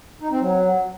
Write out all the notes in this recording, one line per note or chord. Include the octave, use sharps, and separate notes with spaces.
D#4
C4
F#3